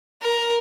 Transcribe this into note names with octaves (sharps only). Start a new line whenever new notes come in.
A#4